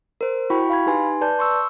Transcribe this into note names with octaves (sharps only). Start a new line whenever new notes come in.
A#4 C5
E4 F#4 G5 B5 C#6
F5 B5 G#6
D#4 G4 B4 G#5 C6
B4 D5 A5 G6
C6 C#6 E6